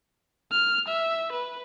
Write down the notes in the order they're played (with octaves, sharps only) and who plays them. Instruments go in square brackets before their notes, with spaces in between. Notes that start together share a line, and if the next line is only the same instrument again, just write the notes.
[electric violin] F6
E5
B4